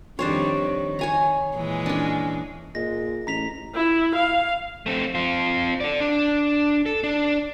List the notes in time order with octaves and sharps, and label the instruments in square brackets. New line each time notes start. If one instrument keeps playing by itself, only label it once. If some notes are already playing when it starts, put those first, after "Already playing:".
[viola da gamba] F2 D#3 G3 [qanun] D4 C5 C#5
[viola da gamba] D#3
[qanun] C#5 G#5 A#5
[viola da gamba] A#2 E3 G#3
[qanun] C#4 D4
[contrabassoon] A#2 [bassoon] G#3 [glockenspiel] A#6
[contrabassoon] A1 [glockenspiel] A#5 B6 F7
[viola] E4
F5
[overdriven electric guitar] A3 C4
C4 F4
A4 D5
D4
A4
D4